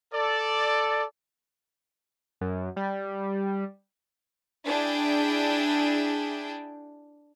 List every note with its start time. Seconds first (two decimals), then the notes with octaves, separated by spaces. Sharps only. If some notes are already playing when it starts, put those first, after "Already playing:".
0.13 A4 D5
2.41 F#2
2.76 G3
4.66 D4 E4 G#4 G5